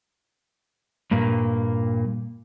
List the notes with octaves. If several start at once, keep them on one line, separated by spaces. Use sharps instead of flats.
G2 A#2 A#3